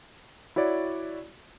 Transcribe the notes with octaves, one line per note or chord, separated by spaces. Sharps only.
E4 F#4 C#5 D5